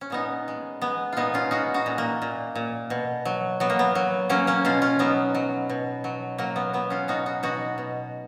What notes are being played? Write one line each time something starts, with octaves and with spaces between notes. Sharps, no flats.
C#4
A#2 B3 D#4
G#3
G#3 B3
A#2 B3 D#4 F4
C#4 F4
G#3 D#4 F#4
D#4 F#4
A#2
A#3
A#2
A#2
B2
F#3
F#3 B3
A#3
B3
F#3
F#3 A#3 C#4
A#3 C#4
B2 C#4 F4
C#4 F4
F#3 B3 D#4
F#3
B2
F#3
F#3 A#3
B3
F#3 B3
C#4 F4
B2 D#4 F#4
D#4 F#4
B2 D#4 F#4
B2